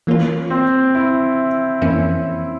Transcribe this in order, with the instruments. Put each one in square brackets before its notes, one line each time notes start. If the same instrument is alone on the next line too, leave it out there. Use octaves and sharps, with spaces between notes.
[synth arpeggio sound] E3 A#3 C#4 F4
[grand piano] C4
E4
[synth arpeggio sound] F2 E3 A#3 C#4 E4